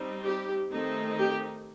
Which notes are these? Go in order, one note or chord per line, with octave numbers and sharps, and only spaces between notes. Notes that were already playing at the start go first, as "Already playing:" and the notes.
Already playing: G3 C4 D#4
G4
D#3 A3 C4 D#4
G4